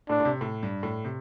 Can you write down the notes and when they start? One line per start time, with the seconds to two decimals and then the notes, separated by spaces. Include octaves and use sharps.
0.09 A2 D4
0.20 A2
0.25 C3
0.41 A2
0.63 G2
0.83 A2
1.05 C3